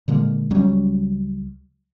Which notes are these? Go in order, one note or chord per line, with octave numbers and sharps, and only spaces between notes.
A#2 D3 G#3 A#3
C#2 F#3 G3 C#4